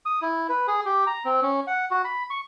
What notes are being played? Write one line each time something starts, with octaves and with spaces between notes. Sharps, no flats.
D#6
E4
B4
G#4
G4
A#5
C4
C#4
F#5
F#4
B5
C#6